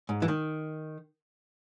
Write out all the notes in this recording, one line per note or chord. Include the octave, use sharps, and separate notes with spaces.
G#2
E3
D#3